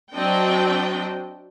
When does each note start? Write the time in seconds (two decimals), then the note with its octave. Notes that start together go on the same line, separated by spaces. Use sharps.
0.15 F#3 C4 D4 D#5 G5